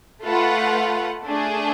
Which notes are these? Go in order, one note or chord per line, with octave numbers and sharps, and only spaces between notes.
A3 F4 B4 F#5
A3 D4 G#4